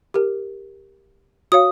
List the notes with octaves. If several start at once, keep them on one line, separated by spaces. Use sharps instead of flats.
G4 A#4
F#4 C#5 F5 D#6